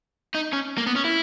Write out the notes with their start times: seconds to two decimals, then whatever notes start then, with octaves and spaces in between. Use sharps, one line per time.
0.35 D#4
0.53 C#4
0.78 A#3
0.87 B3
0.96 C#4
1.05 E4